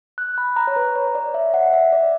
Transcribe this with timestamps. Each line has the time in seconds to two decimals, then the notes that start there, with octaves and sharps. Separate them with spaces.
0.18 F#6
0.38 B5
0.56 A#5
0.67 C#5
0.76 B4
0.96 C#5
1.07 C#5
1.15 D5
1.34 E5
1.54 F#5
1.73 E5
1.92 D5